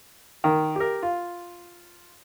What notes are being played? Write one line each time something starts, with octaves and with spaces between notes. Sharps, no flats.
D#3
G4 A#4
F4